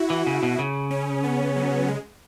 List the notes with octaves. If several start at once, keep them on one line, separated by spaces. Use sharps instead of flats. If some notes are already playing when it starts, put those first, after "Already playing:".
Already playing: E4 F#4
E3
C#3
B2
C#3
C#4
B3
F#3
G#3